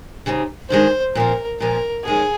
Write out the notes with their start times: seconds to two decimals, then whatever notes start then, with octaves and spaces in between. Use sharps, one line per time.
0.26 C#3 G3 C4 D#4
0.70 G2 D#3 G#3 D#4 C5
1.15 A#2 F3 C4 A#4
1.60 A#2 F3 G#3 A#4
2.05 F2 D#3 G#3 C#4 G#4